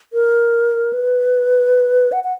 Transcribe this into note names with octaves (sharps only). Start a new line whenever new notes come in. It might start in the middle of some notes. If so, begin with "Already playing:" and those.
A#4
B4
F#5
F#5